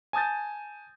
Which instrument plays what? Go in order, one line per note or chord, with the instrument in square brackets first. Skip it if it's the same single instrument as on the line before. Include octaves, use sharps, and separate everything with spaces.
[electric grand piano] G#5 A5 D#6 G6 A6